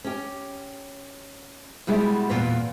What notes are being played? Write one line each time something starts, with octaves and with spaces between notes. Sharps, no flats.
C#4 G4
B2 G3 G#3 E4 F#4
E2 A#2 B3